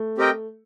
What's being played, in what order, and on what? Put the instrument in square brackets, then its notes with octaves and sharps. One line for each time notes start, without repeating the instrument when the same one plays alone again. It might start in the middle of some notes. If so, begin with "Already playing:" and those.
Already playing: [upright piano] A3
[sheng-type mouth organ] C4 G4 A#4 D#5 G5